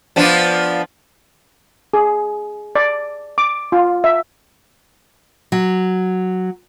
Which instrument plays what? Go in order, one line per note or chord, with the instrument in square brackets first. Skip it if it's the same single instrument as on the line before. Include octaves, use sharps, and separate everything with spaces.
[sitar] F3 B3 D4
[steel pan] G#4
D5
D6
F4
E5
[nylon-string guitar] F#3